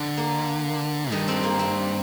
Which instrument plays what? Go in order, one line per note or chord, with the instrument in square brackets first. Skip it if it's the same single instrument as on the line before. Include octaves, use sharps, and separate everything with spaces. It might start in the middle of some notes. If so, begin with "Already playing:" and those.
Already playing: [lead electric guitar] D3
[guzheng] A#3
[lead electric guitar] G2 [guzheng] D#3
[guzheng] C4
A#3
C4